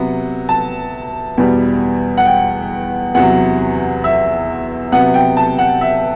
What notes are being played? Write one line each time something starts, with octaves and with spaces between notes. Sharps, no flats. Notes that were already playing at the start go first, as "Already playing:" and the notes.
Already playing: C3 F#3 B3
A5
E2 B2 G3
F#5
G5
E2 C3 F#3 F#5
E5
C3 F#3 B3 F#5
G5
A5
F#5
E5